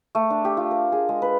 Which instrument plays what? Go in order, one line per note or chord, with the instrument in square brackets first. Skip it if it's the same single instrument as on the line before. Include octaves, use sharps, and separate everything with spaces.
[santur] A3
D4
G4
F4
A#4
G#4
G#3
B4